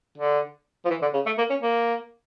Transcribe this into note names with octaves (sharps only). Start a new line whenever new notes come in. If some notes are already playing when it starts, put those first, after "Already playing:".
D3
F3
E3
D3
C#3
A3
A#3
C#4
A#3